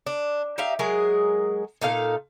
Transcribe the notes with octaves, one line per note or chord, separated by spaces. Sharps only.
D4
D#4 G4 E5 F5
F#3 G#3 G#4 A#4
A#2 D#4 A4 F5